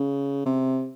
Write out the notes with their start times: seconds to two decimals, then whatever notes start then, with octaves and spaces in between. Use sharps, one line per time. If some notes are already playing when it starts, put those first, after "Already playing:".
Already playing: C#3
0.46 C3